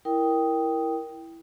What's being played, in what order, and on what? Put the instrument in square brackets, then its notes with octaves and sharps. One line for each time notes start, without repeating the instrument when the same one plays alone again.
[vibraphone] E4 A#4 G5 D#6